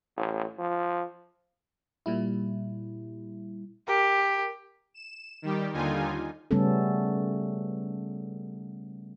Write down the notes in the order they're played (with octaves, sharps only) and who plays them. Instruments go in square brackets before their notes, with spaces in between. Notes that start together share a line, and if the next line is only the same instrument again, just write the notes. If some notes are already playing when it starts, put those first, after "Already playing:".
[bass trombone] A1
F3
[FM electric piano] A#2 G3 E4
[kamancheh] G4 [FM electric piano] A#4
[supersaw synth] E7
D#3 G3 G4
D#2 D3 G3 D#4 F4 G#5
[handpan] C#3 G3 A3 B3 C#4 A4